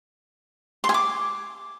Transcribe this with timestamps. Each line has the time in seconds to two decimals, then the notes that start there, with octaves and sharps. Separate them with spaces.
0.84 C6
0.89 G#5
0.94 D6